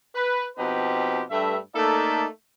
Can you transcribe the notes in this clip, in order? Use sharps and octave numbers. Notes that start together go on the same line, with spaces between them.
B4
B2 F3 C4 D#4 G4 B4
G2 A3 E5
A3 A#3 D#4 A4 D5 E5